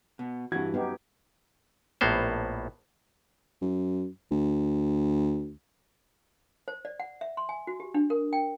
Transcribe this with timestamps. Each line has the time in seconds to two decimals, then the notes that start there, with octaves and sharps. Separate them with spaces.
0.19 B2
0.52 G2 E3 F#4 G#6
0.74 F#2 B3 D#4 G4
2.01 A#1 A2 A#3 B3 C5
3.62 F#2
4.31 D2
6.68 C5
6.85 D5
7.00 F#5
7.21 E5
7.37 C6
7.49 G#5
7.67 F#4
7.80 G4
7.94 D4
8.10 A#4
8.33 G5